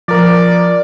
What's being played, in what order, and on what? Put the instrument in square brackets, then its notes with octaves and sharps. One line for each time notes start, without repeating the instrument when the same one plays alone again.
[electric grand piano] F3 A#4 [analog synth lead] D5